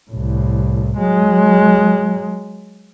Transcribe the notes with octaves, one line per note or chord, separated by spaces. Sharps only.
C2 A2
F#3 G#3